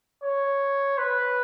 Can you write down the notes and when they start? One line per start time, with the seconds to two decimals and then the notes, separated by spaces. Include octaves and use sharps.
0.24 C#5
0.98 B4